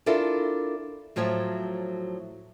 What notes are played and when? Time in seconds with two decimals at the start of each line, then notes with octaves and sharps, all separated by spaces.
0.06 D4 E4 F4 A4 A#4
1.16 A2 F3 F#3 F4 C#5 E5